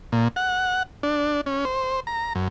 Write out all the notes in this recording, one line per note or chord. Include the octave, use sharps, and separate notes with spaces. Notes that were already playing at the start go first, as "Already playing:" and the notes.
A#2
F#5
D4
C#4
C5
A#5
F#2